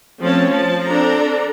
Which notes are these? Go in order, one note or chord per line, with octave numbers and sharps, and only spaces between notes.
F3 A3 C4 C#4 C#5 A5
F3 A5
C4 D4 A4 A#5